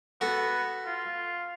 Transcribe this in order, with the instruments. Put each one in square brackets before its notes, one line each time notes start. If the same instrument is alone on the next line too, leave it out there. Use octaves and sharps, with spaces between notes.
[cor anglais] B3 [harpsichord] F#4 A4
[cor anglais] F4